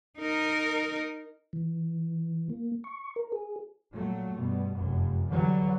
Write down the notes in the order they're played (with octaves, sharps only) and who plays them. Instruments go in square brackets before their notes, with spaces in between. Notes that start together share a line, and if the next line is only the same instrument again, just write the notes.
[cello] D#4 A#4
[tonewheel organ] E3
A#3
C#6
A#4
G#4
[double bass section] A#2 F#3 A3
G2 B2
F1 F#2
D3 E3 F#3 G3